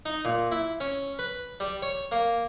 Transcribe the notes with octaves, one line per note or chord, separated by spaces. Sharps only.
D#4
A#2
E4
C#4
B4
G3
C#5
A#3